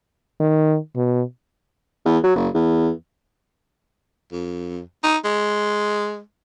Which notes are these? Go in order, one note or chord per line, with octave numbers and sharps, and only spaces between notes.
D#3
B2
E2
F#3
F#1
E2
F2
D#4
G#3